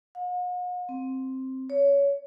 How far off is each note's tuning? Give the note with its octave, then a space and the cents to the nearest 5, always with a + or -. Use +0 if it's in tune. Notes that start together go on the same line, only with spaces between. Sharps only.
F#5 -45
C4 +5
C#5 +20